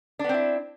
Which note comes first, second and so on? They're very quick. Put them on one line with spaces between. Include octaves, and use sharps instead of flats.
D4 B3 C4 E4